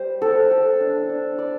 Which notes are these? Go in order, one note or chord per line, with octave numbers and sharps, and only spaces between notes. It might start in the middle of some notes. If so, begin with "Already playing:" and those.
Already playing: G3 C5
A4
A4
D4
D4
D5